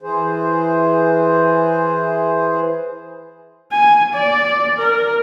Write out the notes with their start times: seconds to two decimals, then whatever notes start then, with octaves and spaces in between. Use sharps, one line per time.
0.02 E3 G#4 C5
3.72 G#5
4.14 D5
4.79 A#4